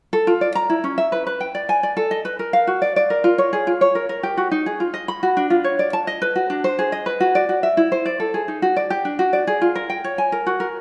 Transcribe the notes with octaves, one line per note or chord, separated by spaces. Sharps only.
A4
F4
D5
A#5
E4
C#4
E5
B4
B4
G5
D5
G#5
D5
A4
D#5
B4
A#4
F5
F#4
D5
D5
A#4
F4
C#5
G#4
F4
C#5
A#4
A#4
G4
F#4
D#4
G#4
F4
D#5
B5
F#4
D4
F4
C#5
D5
A5
D#5
B4
F#4
D4
C5
G#4
D#5
B4
F#4
D5
F#4
E5
E4
C5
D5
A4
G#4
D#4
F#4
D5
G4
D4
F#4
D5
G#4
F4
A#4
G5
C#5
G#5
A#4
F#4
A#4